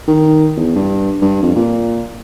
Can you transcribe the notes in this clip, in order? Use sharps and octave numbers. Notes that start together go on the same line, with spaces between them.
D#3
E2
G2
G2
F2
A#2